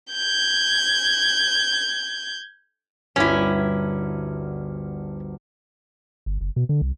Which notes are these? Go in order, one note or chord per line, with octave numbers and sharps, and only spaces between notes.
G6 G#6
G1 D2 C#4 E4 C7
G1
F#1
B2
D3
C2